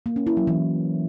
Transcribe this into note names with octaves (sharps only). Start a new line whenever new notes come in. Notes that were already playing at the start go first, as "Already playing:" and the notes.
A#3
C#4
E4
F#3
E3